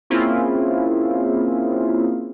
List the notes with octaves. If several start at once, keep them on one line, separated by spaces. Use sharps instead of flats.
A#3 C4 C#4 E4 F4 G#4